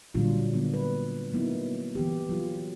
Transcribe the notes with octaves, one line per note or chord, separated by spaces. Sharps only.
A#2 D3 F#3 G3 D4 F4
D3 F#3 A#3 B3 D4
B4
F#3 A#3 B3 D#4 E4
E3 B3 G4
F#3 F4